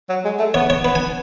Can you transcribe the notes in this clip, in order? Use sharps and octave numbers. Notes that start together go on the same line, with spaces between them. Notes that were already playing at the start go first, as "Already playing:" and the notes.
F#3
G#3
A3
B3 C#5
C#5
B3 B4
G#5